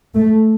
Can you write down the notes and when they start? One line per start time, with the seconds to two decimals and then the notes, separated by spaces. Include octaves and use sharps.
0.14 A3